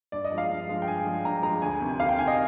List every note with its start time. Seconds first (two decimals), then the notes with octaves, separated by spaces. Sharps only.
0.12 G2 D5
0.25 D#5
0.31 F3 G#3
0.38 F5
0.50 G2
0.69 F3 G#3
0.82 G5
0.87 G2 G#5
1.06 F3 G#3
1.25 G2 A#5
1.43 F3 G#3 A#5
1.62 D2 G#5
1.81 C3 D#3
2.00 D2 F5
2.09 G5
2.19 C3 D#3 G#5
2.28 D#5